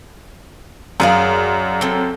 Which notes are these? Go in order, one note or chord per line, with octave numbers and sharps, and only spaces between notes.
F#2 G#4 D5 F5
C4 A4